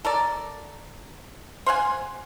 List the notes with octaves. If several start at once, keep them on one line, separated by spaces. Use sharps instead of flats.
A4 A#4 D5
C5 F5 F#5 G#5